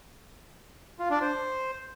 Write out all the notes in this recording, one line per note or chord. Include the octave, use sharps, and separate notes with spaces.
F4
D4
C5